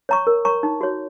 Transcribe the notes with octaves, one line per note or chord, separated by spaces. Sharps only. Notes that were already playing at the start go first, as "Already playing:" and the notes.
C#5 A#5 C#6
A#4
C#5 A#5 C#6
D#4
F#4 C#5